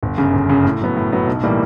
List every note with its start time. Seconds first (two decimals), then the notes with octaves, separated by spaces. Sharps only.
0.03 G1
0.18 F#2 C#3
0.33 G1
0.49 F#2 C#3
0.65 A2
0.81 F#3 B3
0.97 A2
1.12 F#3 B3
1.27 B1
1.43 A2 E3 G3 A#3